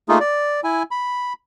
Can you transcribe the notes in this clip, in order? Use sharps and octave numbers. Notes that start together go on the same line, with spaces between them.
A3 A#3 D#4 F4 G#4
D5
E4 G#5
B5